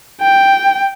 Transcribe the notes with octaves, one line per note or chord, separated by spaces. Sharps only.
G5